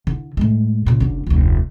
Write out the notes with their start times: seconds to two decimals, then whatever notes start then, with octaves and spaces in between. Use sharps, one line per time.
0.07 D3 E4
0.37 A2 G#3
0.86 A#2 C#3
1.00 F#1 D3
1.26 F1 D2